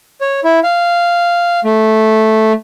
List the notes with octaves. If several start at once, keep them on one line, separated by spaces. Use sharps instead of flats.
C#5
E4
F5
A3